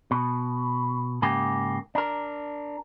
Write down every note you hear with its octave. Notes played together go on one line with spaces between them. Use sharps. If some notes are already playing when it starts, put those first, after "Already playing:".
B2
G#2 C#3 A#3 G4
D4 A#4